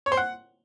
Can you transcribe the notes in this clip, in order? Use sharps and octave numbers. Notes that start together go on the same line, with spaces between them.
C#5
C5
F#5